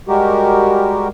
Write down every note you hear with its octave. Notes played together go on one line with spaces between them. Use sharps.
G3 G#3 F#4 G4 A#4